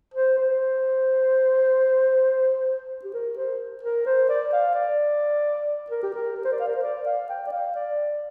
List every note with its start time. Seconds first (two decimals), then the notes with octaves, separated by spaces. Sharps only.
0.14 C5
0.38 C5
3.04 G4
3.14 A#4
3.37 C5
3.83 A#4
4.06 C5
4.29 D5
4.53 F5
4.75 D5
5.90 A#4
6.03 G4
6.13 A#4
6.36 A#4
6.45 C5
6.52 D5
6.60 F5
6.68 A#4
6.75 C5
6.83 D5
7.06 F5
7.29 G5
7.47 D5
7.52 F5
7.75 D5